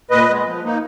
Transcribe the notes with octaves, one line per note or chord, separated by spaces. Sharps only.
A#2 B4 D#5
G#3 B3
F3
A#3 D#4